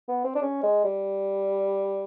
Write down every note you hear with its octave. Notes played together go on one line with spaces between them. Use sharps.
B3
C4
D4
C#4
G#3
G3